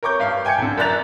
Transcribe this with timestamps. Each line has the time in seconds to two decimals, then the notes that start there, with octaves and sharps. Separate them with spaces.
0.03 A#4 C#5 C#6 D6 G6
0.20 G2 F5
0.45 G5 G#5 G6 G#6 C#7
0.58 C2 D3
0.77 F#2 A#4 D5 F#6 A6 F7